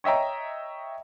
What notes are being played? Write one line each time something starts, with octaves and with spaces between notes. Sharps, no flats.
C#5 D#5 E5 G5 A#5